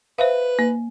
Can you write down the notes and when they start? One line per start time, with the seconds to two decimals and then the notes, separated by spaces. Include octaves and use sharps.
0.19 B4 C5 E5 F5
0.59 A#3